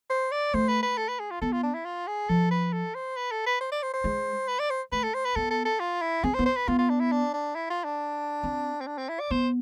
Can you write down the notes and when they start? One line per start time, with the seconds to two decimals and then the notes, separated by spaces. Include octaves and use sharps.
0.10 C5
0.32 D5
0.54 A3 C5
0.69 B4
0.83 B4
0.97 A4
1.09 B4
1.20 G#4
1.31 F4
1.42 B3 A4
1.52 F4
1.63 D4
1.74 E4
1.85 F4
2.07 G#4
2.29 F3 A4
2.51 B4
2.73 A4
2.95 C5
3.16 B4
3.31 A4
3.46 B4
3.61 C5
3.72 D5
3.83 C5
3.94 C5
4.04 G#3
4.48 B4
4.59 D5
4.70 C5
4.92 A3 B4
5.03 A4
5.14 C5
5.25 B4
5.36 B3 A4
5.51 A4
5.65 A4
5.80 F4
6.02 E4
6.24 C4 G#4
6.34 C5
6.39 B3
6.46 C5
6.57 B4
6.68 B3 F4
6.79 F4
6.90 D4
7.00 E4
7.12 D4
7.34 D4
7.55 E4
7.70 F4
7.84 D4
8.43 C4
8.81 C4
8.87 D4
8.98 C4
9.09 E4
9.20 D5
9.31 B3 C5